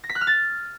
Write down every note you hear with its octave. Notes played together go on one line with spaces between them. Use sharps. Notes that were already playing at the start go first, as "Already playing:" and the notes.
A#6
B6
F#6
F6
A6